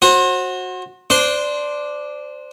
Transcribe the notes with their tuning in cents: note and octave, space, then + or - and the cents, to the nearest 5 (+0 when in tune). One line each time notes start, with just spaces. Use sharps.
F#4 -10 C5 +35
D4 +0 C5 -20 C6 +0